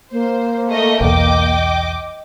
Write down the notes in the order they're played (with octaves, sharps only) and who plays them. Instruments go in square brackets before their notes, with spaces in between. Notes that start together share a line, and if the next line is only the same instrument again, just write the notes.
[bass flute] A#3 [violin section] C5
[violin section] A3 D#5
[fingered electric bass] B1 E2 [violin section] D#5 G5 D6